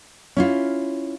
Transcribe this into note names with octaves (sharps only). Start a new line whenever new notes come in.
C#4 E4 F4